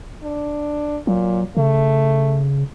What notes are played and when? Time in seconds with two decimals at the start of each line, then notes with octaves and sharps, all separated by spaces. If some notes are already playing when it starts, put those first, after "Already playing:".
0.23 D4
1.07 A#2 F#3
1.57 C#3 A3